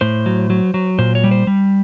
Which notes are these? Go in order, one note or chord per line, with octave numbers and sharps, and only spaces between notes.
A2 C5
F#3
F#3
F#3
A#2 C5
C#5
G3
C5
G3